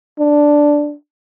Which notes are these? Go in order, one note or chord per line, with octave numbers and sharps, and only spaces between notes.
D4